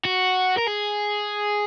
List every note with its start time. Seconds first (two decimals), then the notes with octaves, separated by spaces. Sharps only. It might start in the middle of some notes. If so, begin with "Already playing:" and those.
0.05 F#4
0.57 A#4
0.67 G#4